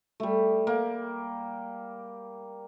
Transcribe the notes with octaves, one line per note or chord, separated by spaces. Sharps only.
G3 A3
A#3